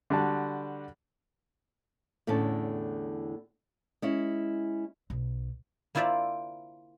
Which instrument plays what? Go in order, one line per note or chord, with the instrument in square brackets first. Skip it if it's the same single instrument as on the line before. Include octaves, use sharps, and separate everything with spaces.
[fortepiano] D3 G3 F#4 A5
[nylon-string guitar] E2 A2 D3 C#4 A5
G#3 C#4 E4
[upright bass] B1
[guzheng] A#3 E4 F4 C5 D5 E5